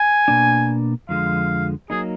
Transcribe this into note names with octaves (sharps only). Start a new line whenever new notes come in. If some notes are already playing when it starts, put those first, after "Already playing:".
Already playing: G#5
B2 A#3 D4
F2 D3 F3 G#3 F5
F#3 A#3 D#4 G#4